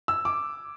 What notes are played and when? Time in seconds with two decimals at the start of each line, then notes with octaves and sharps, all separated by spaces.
0.08 E6
0.25 D6